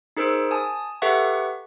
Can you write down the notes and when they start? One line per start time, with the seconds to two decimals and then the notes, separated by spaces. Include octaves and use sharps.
0.17 D#4 G#4 A#4 C5 E6 D7
0.51 G#5 A5 D#6
1.02 G4 A4 B4 E5 F#5 C#6